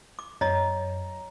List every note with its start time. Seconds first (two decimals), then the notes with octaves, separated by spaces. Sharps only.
0.19 D6
0.41 F#2 C#5 D#5 A#5